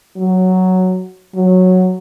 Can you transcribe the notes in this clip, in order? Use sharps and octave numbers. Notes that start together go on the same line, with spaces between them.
F#3
F#3